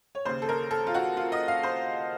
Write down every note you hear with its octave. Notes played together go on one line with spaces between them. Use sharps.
C#5
D#2 C#3 C5
A4
A#4
A4
F4
F#4
F4
D#5
F5
C5